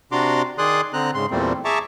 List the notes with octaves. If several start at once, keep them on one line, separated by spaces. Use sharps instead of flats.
C3 D4 F#4 A#5 C6 D6
D#3 G#4 D5 C6 D#6 F#6
D3 C4 A#5 F#6
G#2 C#3 C6
E2 A#2 G3 A3 C4
G#4 E5 A5 A#5 C#6 D6